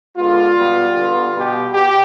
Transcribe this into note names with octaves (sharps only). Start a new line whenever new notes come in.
D3 G#3 B3 F4
B2 G3 B3
D3 G3 B3
B2 B3 G4
B2 G4